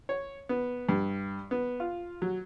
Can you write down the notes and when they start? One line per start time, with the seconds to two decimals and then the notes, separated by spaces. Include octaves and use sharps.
0.09 C#5
0.49 B3
0.89 G2
1.51 B3
1.80 F4
2.22 F#3